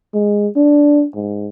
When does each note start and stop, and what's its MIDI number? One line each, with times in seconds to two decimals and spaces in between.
0.14 0.48 56
0.56 1.05 62
1.14 1.48 44